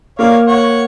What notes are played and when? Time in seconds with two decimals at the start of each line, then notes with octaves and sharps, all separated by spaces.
0.19 A#3 C#5 D5 F5
0.48 C#5 F#5 C#6